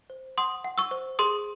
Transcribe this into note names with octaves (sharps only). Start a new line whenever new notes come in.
C5
F#5 C6 D#6
F#5
C#6 E6
C5
G#4 C6 D#6